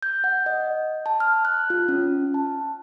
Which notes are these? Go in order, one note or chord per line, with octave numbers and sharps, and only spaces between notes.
G6
F#5
D#5
A5
F6
F#6
F4
C#4
A5